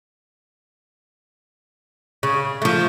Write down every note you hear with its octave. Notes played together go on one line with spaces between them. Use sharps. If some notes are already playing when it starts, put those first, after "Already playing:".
C#3
F3 A3